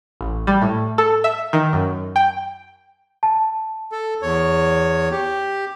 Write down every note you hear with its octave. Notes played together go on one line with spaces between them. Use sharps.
A1
G3
A2
A4
E5
D#3
F#2
G5
A5
A4
E2 C#5
G4